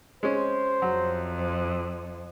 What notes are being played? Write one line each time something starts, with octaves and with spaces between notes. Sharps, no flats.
G#3 C#4 C5
F2 F#3